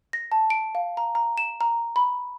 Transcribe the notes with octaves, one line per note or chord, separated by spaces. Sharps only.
A#6
A5
D7
F5
A#5
A#5
E7
A#5
B5